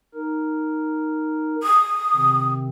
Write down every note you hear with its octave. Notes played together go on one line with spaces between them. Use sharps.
D#4 A#4
D#6
C3 D#3 C4